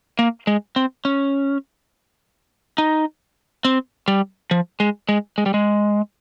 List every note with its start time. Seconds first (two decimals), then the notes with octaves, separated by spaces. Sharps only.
0.19 A#3
0.47 G#3
0.76 C4
1.05 C#4
2.78 D#4
3.65 C4
4.08 G3
4.51 F3
4.80 G#3
5.09 G#3
5.38 G#3
5.46 G3
5.54 G#3